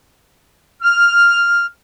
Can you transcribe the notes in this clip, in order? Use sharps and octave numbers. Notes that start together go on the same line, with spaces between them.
F6